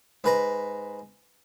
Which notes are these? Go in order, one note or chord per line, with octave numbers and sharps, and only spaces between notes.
G#2 B4 A#5